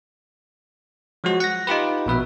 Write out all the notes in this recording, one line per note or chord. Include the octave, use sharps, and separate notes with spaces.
F3 F#3 G#3 F#4
F#5 A#6
D#4 F4 G4 B4
A#1 B2 B4 E5